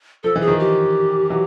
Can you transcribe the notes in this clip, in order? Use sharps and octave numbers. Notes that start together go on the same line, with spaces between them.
F3 A4
E3
G#4
D#3 F3
G4
E3 F#3